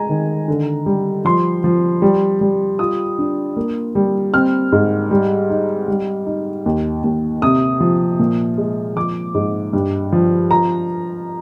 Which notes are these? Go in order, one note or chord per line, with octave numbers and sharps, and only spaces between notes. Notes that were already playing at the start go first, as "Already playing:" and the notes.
Already playing: G#3 G#5 A#5
D#3
D3
G3
F3 C6
F3
G3
G3
F4 D#6
D4
A#3
G3
C4 F6
G#2
G3
D#4
G3
D#4
D#2
D#2
C3 D#6
F3
A#2
G#3
F3 D6
G#2
G2
F3
F4 A#5